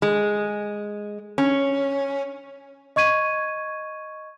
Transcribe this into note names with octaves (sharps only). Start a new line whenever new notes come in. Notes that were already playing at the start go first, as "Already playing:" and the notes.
G#3
C#4
D#5 C#6 G#6 D#7